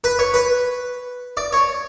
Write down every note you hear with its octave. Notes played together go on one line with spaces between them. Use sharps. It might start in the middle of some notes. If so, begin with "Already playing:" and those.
B4
C#5
B4
D5
C#5